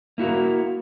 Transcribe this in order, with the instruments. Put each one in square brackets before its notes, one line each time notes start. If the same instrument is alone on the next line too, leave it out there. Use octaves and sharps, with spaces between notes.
[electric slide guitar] A#3 E4 F#4 A#4